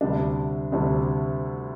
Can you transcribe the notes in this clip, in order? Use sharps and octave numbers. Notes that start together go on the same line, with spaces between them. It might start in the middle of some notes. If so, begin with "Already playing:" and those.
D2 C3 G3 D4
D2 C3 G3 D4